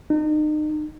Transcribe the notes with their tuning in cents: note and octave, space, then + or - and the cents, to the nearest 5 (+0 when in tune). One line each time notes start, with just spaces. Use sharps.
D#4 -35